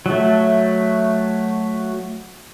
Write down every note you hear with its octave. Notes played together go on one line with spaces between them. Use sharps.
F#3 A3